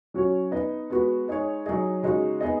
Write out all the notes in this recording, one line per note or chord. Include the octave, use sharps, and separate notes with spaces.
F#3 C#4 F#4 C#5
B3 D#4 B4 D#5
G#3 B3 F#4 B4
G#3 D#4 G#4 C#5
F#3 D#4 G#4 D#5
C#3 G#3 D#4 F#4
B3 D#4 G#4 D#5